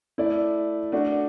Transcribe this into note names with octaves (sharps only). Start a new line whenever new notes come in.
A3 E4 D5
A3 D4 F#4 D5